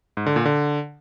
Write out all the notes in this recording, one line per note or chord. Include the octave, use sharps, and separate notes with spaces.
G#2
D3
A#2
D3